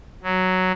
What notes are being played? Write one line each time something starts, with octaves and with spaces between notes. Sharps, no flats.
F#3